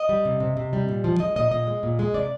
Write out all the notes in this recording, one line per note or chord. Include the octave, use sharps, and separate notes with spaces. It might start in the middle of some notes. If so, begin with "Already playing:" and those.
Already playing: D#5
G3
C3
C3
C3
G3
A#2
F3
G#3 D#5
A#2 D#5
A#2 D#5
G#3
A#2
G#3
C3 D5